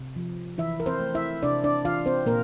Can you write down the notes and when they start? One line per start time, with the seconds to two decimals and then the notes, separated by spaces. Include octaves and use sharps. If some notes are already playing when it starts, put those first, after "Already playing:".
Already playing: C3
0.16 F3
0.58 E3 E4 E5
0.80 A#4
0.86 C4 C5
1.00 A3
1.15 E4 E5
1.43 C3 D4 D5
1.64 D4 D5
1.84 E3 F4 F5
2.06 C4 C5
2.26 A#2 A#3 A#4